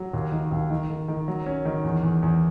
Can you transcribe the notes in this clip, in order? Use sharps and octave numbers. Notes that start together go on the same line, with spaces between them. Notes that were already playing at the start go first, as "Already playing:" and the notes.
Already playing: F#3
D#2
D#3
D#2
D#3
D#3
D#3
F#3
C#4
D#3
E2
E2
E2